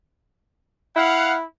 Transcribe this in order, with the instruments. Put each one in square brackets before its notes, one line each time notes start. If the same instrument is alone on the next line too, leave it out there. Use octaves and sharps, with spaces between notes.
[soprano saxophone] E4 [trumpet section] F5 F#5